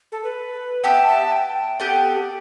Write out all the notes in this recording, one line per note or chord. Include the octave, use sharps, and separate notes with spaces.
A4
B4
B3 G4 E5 A5
A5
G5
B3 G4 A4 D5
A4
A4
G4